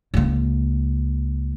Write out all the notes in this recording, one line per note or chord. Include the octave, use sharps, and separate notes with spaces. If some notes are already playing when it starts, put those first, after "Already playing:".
C#2 A#3